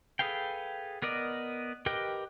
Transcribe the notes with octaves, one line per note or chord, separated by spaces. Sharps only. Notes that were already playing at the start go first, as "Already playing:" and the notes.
G#4 A4 B4 F5 G5
B3 A#4 D5 D#5
G4 A#4 B4 D#5 G5